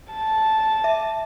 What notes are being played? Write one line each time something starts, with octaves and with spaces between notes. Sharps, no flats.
A5
E5